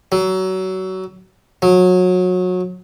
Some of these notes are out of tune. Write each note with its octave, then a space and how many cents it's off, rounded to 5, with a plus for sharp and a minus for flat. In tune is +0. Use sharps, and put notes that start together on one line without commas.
F#3 +25
F#3 -25